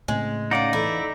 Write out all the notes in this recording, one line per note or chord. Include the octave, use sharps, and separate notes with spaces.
A2 C#3 G#3 C4
C#4 D#4 D5 F5 F#5
E2 E4 A4 A#5